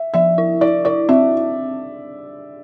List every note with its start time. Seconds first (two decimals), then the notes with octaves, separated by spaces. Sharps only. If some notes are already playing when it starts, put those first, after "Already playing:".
Already playing: E5
0.14 F3 E5
0.38 E4
0.61 E4 D5
0.85 E4 D5
1.09 C4 E5